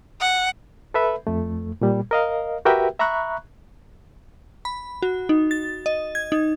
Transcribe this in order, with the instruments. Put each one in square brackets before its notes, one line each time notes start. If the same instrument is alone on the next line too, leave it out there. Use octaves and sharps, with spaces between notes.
[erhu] F#5
[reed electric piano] A4 B4 E5 B5
F2 A3
A#2 G3
A#4 D#5 F5
F#4 G4 A#4 B4 E5 G5
E5 A#5 B5 C#6 F#6
[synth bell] B5
F#4
D#4
A6
D#5
G#6
D#4